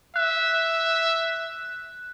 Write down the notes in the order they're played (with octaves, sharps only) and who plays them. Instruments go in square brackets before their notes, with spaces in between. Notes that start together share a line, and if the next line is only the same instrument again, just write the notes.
[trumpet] E5 [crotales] F#6